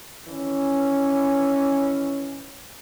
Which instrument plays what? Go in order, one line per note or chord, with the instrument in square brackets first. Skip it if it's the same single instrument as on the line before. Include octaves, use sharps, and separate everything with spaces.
[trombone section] D#3 E3 C#4